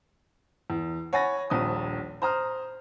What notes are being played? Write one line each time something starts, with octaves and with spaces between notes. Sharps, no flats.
E2
C#5 F#5 G#5 B5 A6 A#6
D#1 A#1 D#6
C5 A#5 D#6 F6